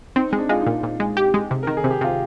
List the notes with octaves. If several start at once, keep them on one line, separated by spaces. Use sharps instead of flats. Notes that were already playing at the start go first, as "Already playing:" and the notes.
C4 D#4
G#3
D4
G#3 F4
D#4
A#2
A#2
G#3
G4
G#3
C3
D#3 A#4
G#4
C3
G4
C3 F4